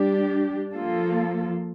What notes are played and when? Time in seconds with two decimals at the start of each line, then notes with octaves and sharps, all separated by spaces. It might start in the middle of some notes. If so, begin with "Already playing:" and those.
Already playing: G3 D4 G4
0.72 F3 A#3 F4 A4